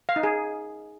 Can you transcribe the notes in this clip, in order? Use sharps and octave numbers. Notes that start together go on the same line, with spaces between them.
F5
D#4
G#4